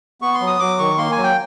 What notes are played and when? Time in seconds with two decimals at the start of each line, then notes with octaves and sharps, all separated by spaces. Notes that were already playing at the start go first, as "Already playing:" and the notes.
0.21 B3 C#6
0.34 C6
0.40 F#3
0.47 D#6
0.59 F#3 D6
0.79 D#3 C#6
0.98 A#3 C6
1.11 G#5
1.17 F#3
1.23 G5